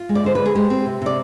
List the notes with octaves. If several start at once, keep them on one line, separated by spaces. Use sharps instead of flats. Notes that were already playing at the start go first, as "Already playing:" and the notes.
Already playing: F4
G#3
D5
D3 C5
D3 B4
G#4
G#3 G4
C4
C3
C3 D5